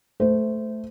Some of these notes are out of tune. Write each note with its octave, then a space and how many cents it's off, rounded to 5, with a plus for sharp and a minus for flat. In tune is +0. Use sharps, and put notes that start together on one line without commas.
A3 -5 C5 -20